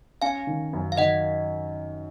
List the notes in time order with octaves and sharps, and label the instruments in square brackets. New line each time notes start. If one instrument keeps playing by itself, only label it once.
[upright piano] C#4 [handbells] F5 G#5
[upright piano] D#3
F#2
[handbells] F5
[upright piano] D#3 [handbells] D#5 F#5